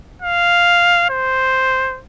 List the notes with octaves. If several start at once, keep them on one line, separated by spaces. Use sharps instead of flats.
F5
C5